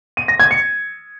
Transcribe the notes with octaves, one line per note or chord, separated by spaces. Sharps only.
D#7
A#6
G#6
C#7